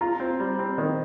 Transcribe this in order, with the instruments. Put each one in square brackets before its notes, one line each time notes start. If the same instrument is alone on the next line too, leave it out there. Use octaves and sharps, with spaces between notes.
[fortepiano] F4 [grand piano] A#5
[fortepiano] C4
G3
C4
D#3